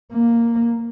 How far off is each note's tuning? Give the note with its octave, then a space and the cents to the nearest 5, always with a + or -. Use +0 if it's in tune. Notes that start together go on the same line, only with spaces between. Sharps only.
A#3 +0